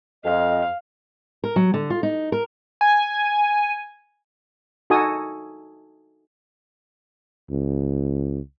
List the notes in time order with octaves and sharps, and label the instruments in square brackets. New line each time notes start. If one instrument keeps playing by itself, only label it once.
[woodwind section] F2 [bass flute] D#5 [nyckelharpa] F5
[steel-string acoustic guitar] A#4
F#3
D3
F4
D#4
A#4
[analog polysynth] G#5
[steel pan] D#4 F#4 A4 G#5 D#6
[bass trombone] C#2